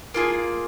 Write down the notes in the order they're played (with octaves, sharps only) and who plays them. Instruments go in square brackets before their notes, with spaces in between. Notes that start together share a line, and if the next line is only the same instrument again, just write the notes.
[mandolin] A#3 F4 G#4